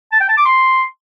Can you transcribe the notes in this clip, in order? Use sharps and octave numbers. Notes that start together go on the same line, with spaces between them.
A5
G5
A5
D6
C6